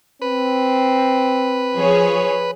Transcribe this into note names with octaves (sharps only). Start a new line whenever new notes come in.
C4 B4
F3 G#4 C#5